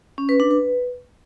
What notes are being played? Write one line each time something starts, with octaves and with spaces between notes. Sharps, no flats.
C#4
B4
D4
B4